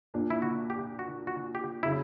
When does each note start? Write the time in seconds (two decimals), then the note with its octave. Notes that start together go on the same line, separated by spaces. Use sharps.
0.14 A#2 A#3 D4
0.30 E4
0.42 F#4
0.70 G4
0.99 F#4
1.27 F#4
1.55 G4
1.83 C#3 F#3 E4